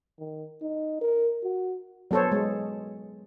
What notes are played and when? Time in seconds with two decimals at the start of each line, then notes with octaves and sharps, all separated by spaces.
0.19 D#3
0.62 D#4
1.01 A#4
1.43 F#4
2.11 F#3 B3 A4 C5 C#5
2.32 G#3